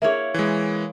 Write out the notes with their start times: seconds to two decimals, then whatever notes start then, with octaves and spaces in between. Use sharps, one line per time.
0.02 A#3 E4 G#4 A#4 C#5 E5
0.34 E3 G#3